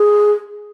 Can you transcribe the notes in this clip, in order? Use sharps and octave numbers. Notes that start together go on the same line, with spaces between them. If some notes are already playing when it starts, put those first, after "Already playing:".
Already playing: G#4